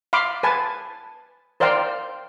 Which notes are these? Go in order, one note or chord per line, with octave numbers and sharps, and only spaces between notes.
F5 B5 C6 D6
B4 G#5 A5
A#4 C5 D5 F5 G5 C6